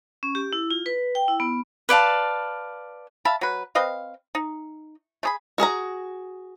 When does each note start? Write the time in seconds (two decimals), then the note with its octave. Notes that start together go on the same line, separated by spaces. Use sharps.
0.23 C#4
0.35 G4
0.53 E4
0.71 F4
0.86 B4
1.15 G5
1.28 E4
1.40 B3
1.89 B4 D5 F5 A5
3.25 E5 F5 A5 B5
3.41 F#3 B4
3.75 C4 B4 D#5 F5
4.35 D#4
5.23 A3 G#4 B5
5.58 F#4 G#4 A5 A#5